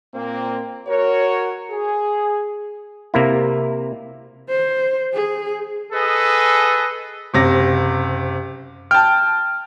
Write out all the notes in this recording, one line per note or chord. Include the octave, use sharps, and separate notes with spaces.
A#2 A#3 C4
F#4 A#4 C#5
G#4
C3 A#3 E4
C5
G#4
G#4 A4 B4 D#5
F#1 C3 A#6
G5 A5 F6